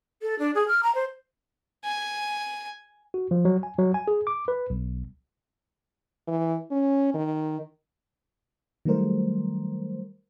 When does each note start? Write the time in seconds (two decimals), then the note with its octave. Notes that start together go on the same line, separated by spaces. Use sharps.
0.22 A4
0.38 D4
0.54 G#4
0.67 F6
0.82 A#5
0.94 C5
1.85 G#5
3.14 F#4
3.31 F3
3.45 F#3
3.63 G#5
3.78 F#3
3.94 G#5
4.08 G#4
4.27 D6
4.48 B4
4.70 B1
6.27 E3
6.71 C#4
7.14 D#3
8.85 D#3 F#3 G3 A3 A#4 C5